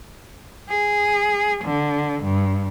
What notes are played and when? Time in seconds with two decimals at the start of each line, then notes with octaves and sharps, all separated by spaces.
0.70 G#4
1.65 D3
2.24 G2